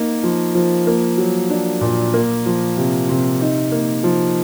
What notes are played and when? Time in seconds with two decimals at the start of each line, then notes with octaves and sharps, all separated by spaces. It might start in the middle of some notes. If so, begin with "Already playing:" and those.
Already playing: A#3 D#4
0.23 F3
0.55 F3
0.87 A#3
1.18 F#3
1.50 D4
1.81 A#2
2.14 A#3
2.46 F3
2.77 C3
3.09 C3
3.41 D#4
3.72 A#3
4.04 F3